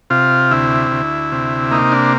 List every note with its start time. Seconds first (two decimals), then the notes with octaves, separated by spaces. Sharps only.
0.10 C3 F4
0.51 D2 E4
0.91 D2
1.32 C3
1.71 A#3 D#4
1.92 D4